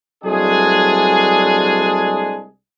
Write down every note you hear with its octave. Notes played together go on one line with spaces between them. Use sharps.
C2 F#3 G#3 A3 D4 G#4